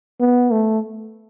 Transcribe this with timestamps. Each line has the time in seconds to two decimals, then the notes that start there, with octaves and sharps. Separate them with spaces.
0.20 B3
0.51 A3